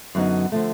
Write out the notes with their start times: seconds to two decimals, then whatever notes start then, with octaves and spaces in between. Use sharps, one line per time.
0.15 F#2 D3 F#3 B3 D#4
0.52 D3 F3 A3